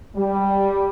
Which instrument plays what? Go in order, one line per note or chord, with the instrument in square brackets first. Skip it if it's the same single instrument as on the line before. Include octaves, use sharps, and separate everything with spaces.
[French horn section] G3